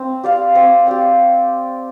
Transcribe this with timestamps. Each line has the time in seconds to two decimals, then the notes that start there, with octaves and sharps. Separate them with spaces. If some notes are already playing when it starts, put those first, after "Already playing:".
Already playing: C4
0.24 G4 D5 F5
0.55 C4
0.87 G4 D5 F5